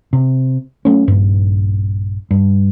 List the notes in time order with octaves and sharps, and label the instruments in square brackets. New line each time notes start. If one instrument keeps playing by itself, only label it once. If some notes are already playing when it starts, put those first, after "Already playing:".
[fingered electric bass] C3
F#3 A3 C#4
A#1 G2
G2